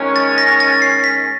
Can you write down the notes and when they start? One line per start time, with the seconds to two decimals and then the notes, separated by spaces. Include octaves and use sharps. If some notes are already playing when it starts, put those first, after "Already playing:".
Already playing: D#3 G#3 C#4
0.16 A6
0.38 A#6
0.60 A6
0.82 C7
1.04 B6